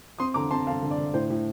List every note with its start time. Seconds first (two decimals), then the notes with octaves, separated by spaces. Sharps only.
0.19 C4 C6 D#6
0.34 D3 A#5 D6
0.51 C4 A5 C6
0.67 D3 F5 A5
0.82 D3
0.91 D5
0.98 D3
1.14 A2 C5
1.30 A2